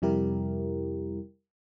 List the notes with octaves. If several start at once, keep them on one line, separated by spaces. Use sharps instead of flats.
F2 C3 G3 E4 G4 A#4